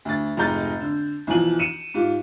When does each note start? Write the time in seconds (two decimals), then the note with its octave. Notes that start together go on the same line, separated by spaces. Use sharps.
0.05 D2 A6
0.37 F1 G#2 G#3 A#5 G6 A6
0.81 D3
1.27 B1 E3 F3 G#5 F#7
1.59 C#7 D#7 E7
1.94 G#2 F4 G4